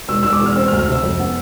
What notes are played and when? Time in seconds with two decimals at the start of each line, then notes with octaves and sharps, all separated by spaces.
0.08 E1 E6
0.23 E1 E6
0.33 D6
0.40 E2
0.46 F6
0.56 C4 E6
0.68 F6
0.72 D2
0.79 F6
0.88 C3 E6
1.03 F2
1.19 B3